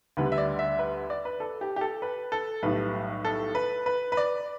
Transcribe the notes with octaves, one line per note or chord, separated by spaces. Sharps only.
D2 D3 G3 B4
E5
D5
E5
B4
D5
B4
A4
G4
G4
A4
B4
A4
B1 A2 G3 B4
A4
B4
B4
B4
D5